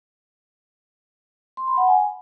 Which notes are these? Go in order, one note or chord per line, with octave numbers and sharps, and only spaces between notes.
C6
B5
F#5
G#5